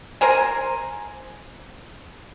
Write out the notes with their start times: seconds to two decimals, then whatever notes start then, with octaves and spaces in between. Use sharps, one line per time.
0.21 A#4 C5 G#5